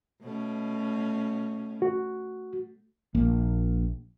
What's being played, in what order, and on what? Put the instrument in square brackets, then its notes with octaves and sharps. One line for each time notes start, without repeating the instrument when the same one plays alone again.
[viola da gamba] B2 A3 C#4
[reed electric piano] F#4
[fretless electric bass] A#1 A#3